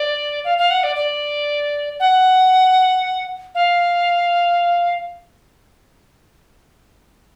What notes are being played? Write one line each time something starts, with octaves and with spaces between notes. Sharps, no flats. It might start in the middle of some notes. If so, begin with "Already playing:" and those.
Already playing: D5
F5
F5
F#5
D5
D5
F#5
F5